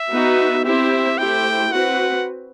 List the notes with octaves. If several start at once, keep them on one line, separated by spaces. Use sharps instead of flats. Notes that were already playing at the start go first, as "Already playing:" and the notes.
Already playing: E5
B3 D#4 F#4 B4
C4 E4 G4 C5 E5
A3 E4 G4 C5 G5
C4 F#4 B4 F#5